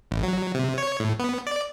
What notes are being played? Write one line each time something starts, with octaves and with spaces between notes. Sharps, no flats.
A1
F#3
C3
C#5
A2
B3
D5